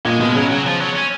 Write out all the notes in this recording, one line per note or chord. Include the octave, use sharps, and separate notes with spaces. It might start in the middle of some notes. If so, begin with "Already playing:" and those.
A#2 G#3
B2 G#3
C#3 F#3
F#3
F3
F#3
C#4